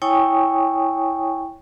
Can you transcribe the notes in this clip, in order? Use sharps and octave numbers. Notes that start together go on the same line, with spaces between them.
E4 C#5 G5 G#5 C#6 D#6